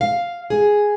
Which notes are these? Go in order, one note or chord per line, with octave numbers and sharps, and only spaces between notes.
F5
G#4